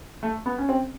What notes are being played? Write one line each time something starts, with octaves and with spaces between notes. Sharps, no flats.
A3
B3
C#4
C4